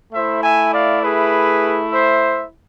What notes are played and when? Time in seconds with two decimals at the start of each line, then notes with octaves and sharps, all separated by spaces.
0.13 A3 E4 C5 E5
0.43 E5 G#5
0.73 D5 F5
1.03 G#4 B4
1.92 C5 E5